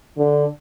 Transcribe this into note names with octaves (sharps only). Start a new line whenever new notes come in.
D3